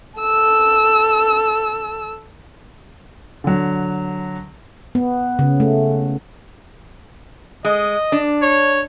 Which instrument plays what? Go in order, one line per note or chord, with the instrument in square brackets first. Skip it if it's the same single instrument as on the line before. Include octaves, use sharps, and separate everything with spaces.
[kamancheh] A4 E6
[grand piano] D3 F#3
[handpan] B3
C#3
A3
[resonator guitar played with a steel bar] G#3 [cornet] D#5
[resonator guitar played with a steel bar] D4
[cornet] C#5